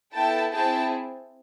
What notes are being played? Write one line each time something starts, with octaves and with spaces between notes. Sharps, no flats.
B3 E4 A4 G5 A5
C4 E4 G#4 G5 A5